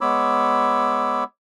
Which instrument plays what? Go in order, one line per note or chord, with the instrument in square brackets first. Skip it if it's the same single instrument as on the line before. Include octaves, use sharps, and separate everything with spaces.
[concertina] G#3 B3 C#5 B5 D6 E6